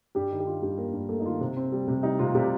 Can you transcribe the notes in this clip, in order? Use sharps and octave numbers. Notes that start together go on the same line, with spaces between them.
G2 G3 G4
D#3
G4
D#3 F4
G2 G3 G4
A#3 A#4
G2
A3 A#3 A4
D#4
D#3 F4
C3
C4
G3
C3
G3 D#4
C3 F4
F4
C3 G3 G4